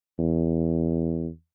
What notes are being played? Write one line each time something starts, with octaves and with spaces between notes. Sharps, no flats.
E2